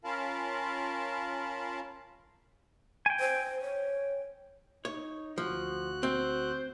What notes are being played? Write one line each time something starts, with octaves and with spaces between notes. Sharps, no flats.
C#4 F4 A#4 F5 A5 B5
G5 G#5
C5
C#5
D#4 C#5
D2 F3 F#4 F#6
C4 C5